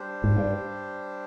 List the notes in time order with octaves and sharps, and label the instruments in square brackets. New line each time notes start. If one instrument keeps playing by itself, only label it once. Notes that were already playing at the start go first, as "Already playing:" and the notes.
Already playing: [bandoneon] G3 D4 G4 C5
[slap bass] G#2
G2